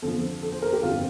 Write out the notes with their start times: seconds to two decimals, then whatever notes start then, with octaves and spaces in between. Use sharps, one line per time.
0.02 F2 D3 F3 A4
0.42 A4
0.52 C5
0.62 A#4
0.73 G4
0.83 G1 F2 D3 F4